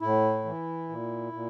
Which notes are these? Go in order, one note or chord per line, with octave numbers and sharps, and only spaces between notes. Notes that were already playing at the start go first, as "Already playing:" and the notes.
A2 E4
E3
A#2
A#2